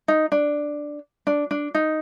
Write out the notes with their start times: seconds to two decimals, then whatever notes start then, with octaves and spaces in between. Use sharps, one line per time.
0.08 D#4
0.32 D4
1.27 D4
1.51 D4
1.74 D#4